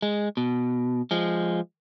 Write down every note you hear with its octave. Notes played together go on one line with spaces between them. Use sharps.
G#3
B2
F3 G#3